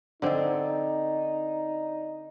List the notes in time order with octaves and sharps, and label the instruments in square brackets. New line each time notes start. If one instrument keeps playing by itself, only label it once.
[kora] D3 C4 [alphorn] D#4 [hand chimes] D5 D#5